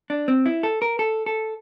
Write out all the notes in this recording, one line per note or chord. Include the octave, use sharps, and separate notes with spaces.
D4
C4
E4
A4
A#4
A4
A4